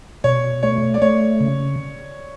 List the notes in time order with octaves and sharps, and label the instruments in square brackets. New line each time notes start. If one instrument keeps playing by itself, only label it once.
[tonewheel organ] B2 [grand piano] C#5
[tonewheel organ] A3 [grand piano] C#5
[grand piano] D5
[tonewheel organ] A3 [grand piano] C#5
[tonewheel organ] C#3